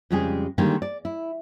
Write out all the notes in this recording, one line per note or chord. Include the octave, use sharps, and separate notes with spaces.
F2 C#3 G3 G#3 G4 G#4
D3 D#3 G3 G#3 A#3
D5
E4